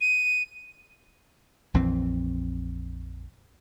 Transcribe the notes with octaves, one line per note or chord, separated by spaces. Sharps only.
D#7
A#1 F2 E3 C4